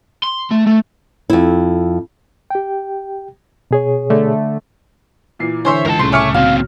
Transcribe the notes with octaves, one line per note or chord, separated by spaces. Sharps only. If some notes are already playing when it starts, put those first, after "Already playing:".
C6
A3
A3
F2 E4
G4 G5
B2 G#4 C#5
D3 A3
A#2 E3 C7
D3 E3 C5 C#5 E5 G#5 C6 C7
C#2 A#4 C5 A5
C2 A2 C#3 A3 C6
C#5 E5 G#5 C#6 D6 F6
D#2 F#3 C4 F5